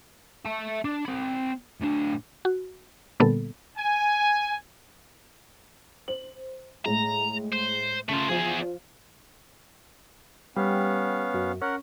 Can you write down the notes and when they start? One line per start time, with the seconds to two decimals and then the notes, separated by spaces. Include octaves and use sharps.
0.45 E5 A5
0.85 D4
1.05 C4 B5
1.81 A2 D4
2.45 F#4
3.20 A#2 D3 G3 A#3 B3 A4
3.78 G#5
6.08 C5 F#7
6.85 A2 G#3 A#5
7.52 C5
8.09 C#3 A3 F4
8.29 E2 F3 F4 G#4
10.57 G3 B3 C#4 F5
11.34 F#2
11.62 C#4 A#4 F#5